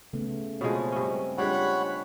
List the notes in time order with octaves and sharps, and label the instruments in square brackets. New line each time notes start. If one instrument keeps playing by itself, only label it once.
[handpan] C#3 A3 B3
[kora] B2 F3 G#3 [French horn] C4 [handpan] C#5
[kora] G2 C#4
[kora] G3 G#3 [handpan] D4 F4 [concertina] C#5 F#5 B5